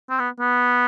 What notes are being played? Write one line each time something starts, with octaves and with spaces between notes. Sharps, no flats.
C4
B3
B3